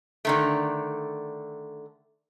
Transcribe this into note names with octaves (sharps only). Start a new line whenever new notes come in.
D3 D#3 A3